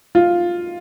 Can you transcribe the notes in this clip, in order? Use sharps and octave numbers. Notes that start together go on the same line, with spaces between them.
F4